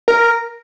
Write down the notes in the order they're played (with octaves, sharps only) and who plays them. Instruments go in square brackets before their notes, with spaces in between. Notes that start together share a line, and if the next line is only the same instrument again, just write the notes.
[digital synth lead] A#4